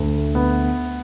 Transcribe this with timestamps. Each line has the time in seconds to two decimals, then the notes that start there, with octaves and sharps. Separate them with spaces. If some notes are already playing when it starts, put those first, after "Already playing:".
Already playing: D2
0.35 B3